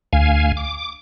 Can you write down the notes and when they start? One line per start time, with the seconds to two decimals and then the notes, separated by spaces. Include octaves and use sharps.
0.13 D2 F5 G#5
0.57 D6